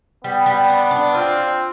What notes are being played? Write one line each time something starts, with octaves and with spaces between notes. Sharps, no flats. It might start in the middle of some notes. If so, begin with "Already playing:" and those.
G3 B3
G3
D4
D4
C4 F4
F4